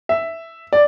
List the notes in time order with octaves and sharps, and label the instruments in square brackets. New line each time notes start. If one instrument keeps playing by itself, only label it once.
[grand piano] E5
D5